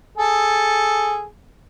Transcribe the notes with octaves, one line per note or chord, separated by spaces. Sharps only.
G#4 A4